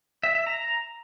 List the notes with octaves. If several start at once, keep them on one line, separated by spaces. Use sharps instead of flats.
E5
E5
A#5